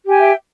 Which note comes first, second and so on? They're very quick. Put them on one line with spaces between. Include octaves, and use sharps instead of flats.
G4 G#5 G5 E5